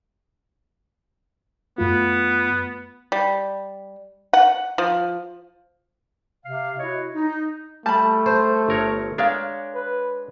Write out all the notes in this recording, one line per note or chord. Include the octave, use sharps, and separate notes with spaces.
F#2 A3 B3 F4
G3
F#5
F3
C3 F5
E4 F#4 C#5 D#5
D#4
G3 A3 A5 B5
C5
G1 A#4 C#5
G#3 D4 A#4 C#5 F5
B4